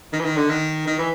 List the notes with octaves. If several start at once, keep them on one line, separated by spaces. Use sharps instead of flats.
D#3
E3
D#3
D3
D#3
D#3
E3